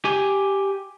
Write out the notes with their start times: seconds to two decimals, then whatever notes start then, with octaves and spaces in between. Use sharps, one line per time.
0.05 G4 G#5